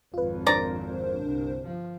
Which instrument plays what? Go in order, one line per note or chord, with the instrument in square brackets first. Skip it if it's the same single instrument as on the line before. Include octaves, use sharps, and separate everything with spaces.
[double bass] G#1 F2 [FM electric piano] F4 B4
[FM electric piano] D4 A#4 C5 [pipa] D5 A#5
[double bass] G1 C2
F3